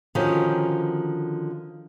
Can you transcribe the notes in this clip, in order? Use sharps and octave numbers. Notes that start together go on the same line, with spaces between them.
D3 D#3 F3 C#4 F#4 G4